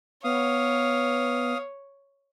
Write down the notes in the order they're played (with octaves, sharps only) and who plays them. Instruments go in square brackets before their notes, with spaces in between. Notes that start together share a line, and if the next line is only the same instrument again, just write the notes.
[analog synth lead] B3 [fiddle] C#5 [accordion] F5 D#6